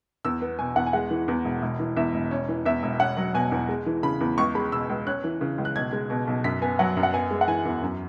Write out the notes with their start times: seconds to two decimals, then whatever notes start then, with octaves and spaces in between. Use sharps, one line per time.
0.25 E2 E6
0.41 B3
0.59 B2 G#5
0.76 E2 F#5
0.87 G#5
0.93 G#3 F#5
1.10 E3
1.28 E2
1.45 E1
1.62 E1
1.79 E3
1.97 E2 E5
2.14 E1
2.31 C#4
2.48 E3
2.66 E2 E5
2.83 E1
3.00 C#4 F#5
3.17 F#3
3.34 B2 G#5
3.52 E2
3.69 G#3
3.86 E3
4.03 C#3 B5
4.21 E2
4.38 C#2 C#6
4.55 G#3 B5
4.72 B2 E6
4.89 C#2
5.07 C#4 F#6
5.24 E3
5.41 C#3
5.58 C#2
5.65 F#6
5.75 B1 G#6
5.93 G#3
6.10 B2
6.27 B1
6.44 F#2 B6
6.62 B3 G#5
6.79 F#3 F#5
6.97 F#2
7.03 F#5
7.13 B3 G#5
7.31 G#3
7.41 F#5
7.48 E3 G#5
7.65 E2
7.82 F#2